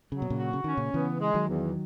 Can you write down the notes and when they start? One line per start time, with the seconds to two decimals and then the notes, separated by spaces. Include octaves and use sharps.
0.12 C#3 F#3
0.22 B2
0.30 A#2 C#3
0.39 F#4
0.53 C#3
0.64 D#3 C#4
0.77 A#2 C#3
0.94 C#3 E3 B3
1.20 G#3
1.34 D#3 F#3
1.48 E2